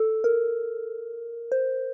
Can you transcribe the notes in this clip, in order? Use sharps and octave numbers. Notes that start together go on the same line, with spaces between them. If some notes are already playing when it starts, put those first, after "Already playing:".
Already playing: A4
A#4
C5